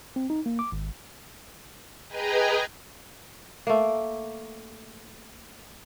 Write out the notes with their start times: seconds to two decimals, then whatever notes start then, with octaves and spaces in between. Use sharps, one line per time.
0.16 C4
0.30 D#4
0.46 A#3
0.59 D6
0.72 G#1
2.08 G#4 B4 D#5 G5 G#5 A#5
3.67 A3 A#3